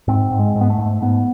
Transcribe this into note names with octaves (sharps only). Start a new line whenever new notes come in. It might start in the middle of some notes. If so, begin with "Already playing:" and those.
G#2 C4
G#2
G#3
G#2
B3
A3
G#2
G#2 B3